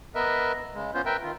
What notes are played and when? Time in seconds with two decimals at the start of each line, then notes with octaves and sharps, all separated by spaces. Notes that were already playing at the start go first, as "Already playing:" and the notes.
0.15 B3 A#4 B4 D#5 E5
0.74 C#3 G#3
0.94 B3 C#4 F4 C5
1.05 A#4 B4 E5 G5
1.23 D#3 F4